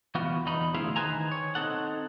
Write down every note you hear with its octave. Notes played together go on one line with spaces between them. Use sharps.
E3 B3 F4 F#4 B4
E2 D#4 B5
D2 E4 G#4 C5 E5 F5
D#3 B4 C5 G#5 A#5
C#5
C4 D#4 A4 F#5